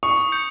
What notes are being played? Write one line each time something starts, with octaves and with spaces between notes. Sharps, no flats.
C#6 D#6
G6 C#7